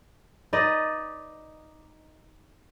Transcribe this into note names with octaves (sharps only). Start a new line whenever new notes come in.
D#4 B4 D5 D#5